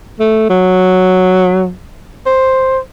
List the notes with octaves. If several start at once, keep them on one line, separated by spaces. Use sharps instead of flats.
A3
F#3
C5